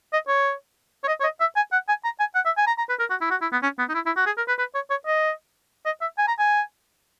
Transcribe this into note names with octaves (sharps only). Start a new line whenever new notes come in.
D#5
C#5
C#5
D#5
C#5
D#5
E5
G#5
F#5
G#5
A#5
G#5
F#5
E5
G#5
A#5
A#5
B4
A#4
F#4
E4
F#4
E4
B3
C#4
B3
D#4
E4
E4
F#4
G#4
A#4
B4
B4
C#5
C#5
D#5
D#5
E5
G#5
A#5
G#5